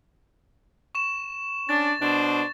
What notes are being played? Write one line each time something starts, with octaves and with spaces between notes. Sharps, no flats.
C#6 E7
C#4 D4 A6
B2 D4 C5